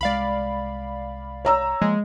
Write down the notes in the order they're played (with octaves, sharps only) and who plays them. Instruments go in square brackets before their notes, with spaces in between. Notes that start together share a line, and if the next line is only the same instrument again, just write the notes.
[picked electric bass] C2 G#3 [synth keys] D5 F5 B5
[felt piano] C#5 A#5 E6
[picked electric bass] F3 A#3 [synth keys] G#3